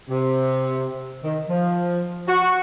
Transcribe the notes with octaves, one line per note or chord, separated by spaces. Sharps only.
C3
D#3
F3
F#4